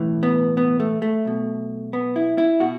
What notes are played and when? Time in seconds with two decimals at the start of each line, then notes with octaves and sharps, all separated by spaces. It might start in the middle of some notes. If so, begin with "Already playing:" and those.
Already playing: B1 A2 E3
0.23 B3
0.57 B3
0.80 A3
1.02 A3
1.25 B1 B2
1.93 B3
2.16 E4
2.38 E4
2.60 B2 F#4